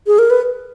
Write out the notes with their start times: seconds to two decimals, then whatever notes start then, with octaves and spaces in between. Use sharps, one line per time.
0.07 G#4
0.19 A#4
0.30 B4